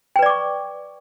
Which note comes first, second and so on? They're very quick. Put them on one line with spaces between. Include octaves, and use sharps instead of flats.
G5 B4 D5 D6 C#6